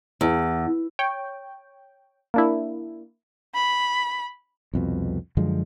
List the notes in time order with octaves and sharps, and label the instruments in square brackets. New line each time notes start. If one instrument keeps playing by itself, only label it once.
[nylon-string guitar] E2
[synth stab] C#5 G5
A#3 D4 E4
[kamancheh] B5
[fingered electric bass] C2 F2 B2
F#2 D3 F3 G#3